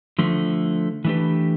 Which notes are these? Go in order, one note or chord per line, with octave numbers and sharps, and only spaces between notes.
D3 F3 A3
E3 A3 D4 G4 B4